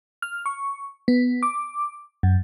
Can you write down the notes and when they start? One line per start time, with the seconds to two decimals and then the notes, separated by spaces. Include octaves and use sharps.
0.22 F6
0.46 C#6
1.08 B3
1.43 D6
2.23 F#2